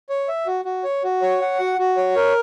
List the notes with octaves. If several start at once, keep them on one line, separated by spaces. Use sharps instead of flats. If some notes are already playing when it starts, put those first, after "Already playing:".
C#5
E5
F#4
F#4
C#5
F#4
C#5
F#5
F#4
F#4
C#5
A#4